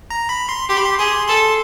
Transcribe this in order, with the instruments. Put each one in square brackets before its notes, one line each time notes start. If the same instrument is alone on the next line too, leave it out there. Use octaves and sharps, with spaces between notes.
[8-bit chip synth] A#5
B5
C6
[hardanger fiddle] G4 [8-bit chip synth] C6
[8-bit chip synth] B5
C6
[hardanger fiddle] G#4 [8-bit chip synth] C6
[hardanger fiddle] A4 [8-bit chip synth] C6